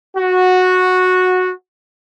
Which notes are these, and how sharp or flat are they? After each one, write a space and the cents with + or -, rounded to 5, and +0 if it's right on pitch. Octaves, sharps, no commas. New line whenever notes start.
F#4 -10